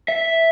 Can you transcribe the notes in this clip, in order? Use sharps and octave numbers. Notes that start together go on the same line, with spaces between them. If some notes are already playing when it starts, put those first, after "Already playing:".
E5